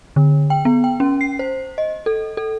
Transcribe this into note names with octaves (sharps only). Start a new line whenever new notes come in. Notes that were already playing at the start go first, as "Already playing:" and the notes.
D3
G5
B3
G5
C#4
C7
C5
D#5
A4
A4